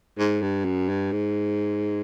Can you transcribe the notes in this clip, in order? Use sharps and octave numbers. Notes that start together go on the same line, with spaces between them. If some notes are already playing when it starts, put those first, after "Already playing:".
G#2
G2
F#2
G2
G#2